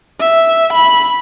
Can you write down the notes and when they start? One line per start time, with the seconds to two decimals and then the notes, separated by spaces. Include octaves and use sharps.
0.20 E5
0.73 B5